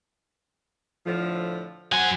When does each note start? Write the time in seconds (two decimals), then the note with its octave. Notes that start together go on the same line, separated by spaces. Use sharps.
1.06 A2 D3 F3
1.93 F#3 C5 F#5 G#5